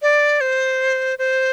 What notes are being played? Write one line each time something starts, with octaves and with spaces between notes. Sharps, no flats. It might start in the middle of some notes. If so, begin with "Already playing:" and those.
D5
C5
C5